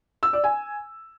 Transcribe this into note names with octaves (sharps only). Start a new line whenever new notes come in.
E6
D5
G#5